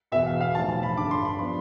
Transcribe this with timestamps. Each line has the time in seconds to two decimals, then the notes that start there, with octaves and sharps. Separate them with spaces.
0.12 E1 E2 B2 E5
0.26 F5
0.41 F5
0.55 B1 A2 F3 A5
0.69 A5
0.83 B5
0.97 G1 G2 D3 D6
1.11 C6
1.25 B5
1.39 F3 B3 D4 C6